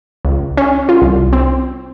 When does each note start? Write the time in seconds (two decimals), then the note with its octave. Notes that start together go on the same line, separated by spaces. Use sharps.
0.25 C#2
0.57 C#4
0.89 F4
1.02 C2
1.33 C4